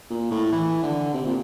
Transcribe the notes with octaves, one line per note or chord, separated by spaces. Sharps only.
A#2
A2
E3
D3
C3
A#2